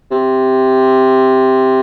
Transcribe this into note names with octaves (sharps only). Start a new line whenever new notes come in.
C3